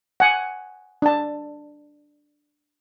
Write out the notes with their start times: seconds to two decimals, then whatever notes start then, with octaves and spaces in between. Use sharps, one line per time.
0.20 F#5 G#5
1.02 D4 A5